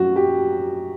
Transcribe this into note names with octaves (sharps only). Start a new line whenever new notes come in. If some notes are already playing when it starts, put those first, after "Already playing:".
Already playing: F#2 F#3 F#4
G4